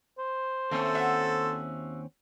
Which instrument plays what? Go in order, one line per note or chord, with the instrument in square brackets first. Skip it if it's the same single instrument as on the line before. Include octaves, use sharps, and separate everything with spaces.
[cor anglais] C5
[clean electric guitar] D#2 C4 C#4 [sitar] A3 [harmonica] A4
[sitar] F#4 E5